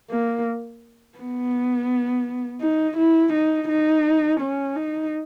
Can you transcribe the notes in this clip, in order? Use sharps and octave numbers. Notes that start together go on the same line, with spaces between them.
A#3
B3
D#4
E4
D#4
D#4
C#4
D#4